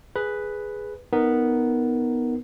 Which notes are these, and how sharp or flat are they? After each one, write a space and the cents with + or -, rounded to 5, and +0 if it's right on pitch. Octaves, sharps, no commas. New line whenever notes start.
G#4 +0 B4 +0
B3 +0 D#4 +0 A#4 +0